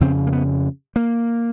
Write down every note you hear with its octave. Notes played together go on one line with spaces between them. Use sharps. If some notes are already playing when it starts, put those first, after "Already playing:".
F2 C#3 C4
A#3
B3
A#3